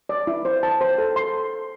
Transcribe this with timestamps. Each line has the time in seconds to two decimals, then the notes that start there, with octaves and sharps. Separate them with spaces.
0.09 D5
0.27 E4
0.45 C5
0.63 A5
0.81 C5
0.98 A4
1.16 C6